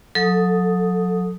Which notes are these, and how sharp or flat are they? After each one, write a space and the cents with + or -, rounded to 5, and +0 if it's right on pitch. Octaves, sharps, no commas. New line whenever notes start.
F#3 -35 A4 +0 D#6 +0